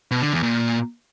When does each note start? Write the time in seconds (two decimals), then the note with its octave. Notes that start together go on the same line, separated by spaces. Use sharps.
0.11 B2
0.22 D3
0.32 E2
0.43 A#2